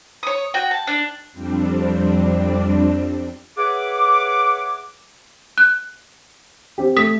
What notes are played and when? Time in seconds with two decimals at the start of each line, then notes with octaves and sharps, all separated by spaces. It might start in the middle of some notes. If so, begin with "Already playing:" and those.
0.23 C#5 D#6
0.54 F#4 G5
0.71 A5
0.87 D4
1.32 F2 G3 C4 D4
3.57 G#4 B4 C#5 E5 F#5 D6
5.58 F#6
6.78 C4 G4
6.97 A3 D#6 B6